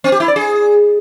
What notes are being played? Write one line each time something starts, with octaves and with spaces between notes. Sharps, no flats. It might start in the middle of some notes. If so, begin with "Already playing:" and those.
C4
G4
E4
D5
G#4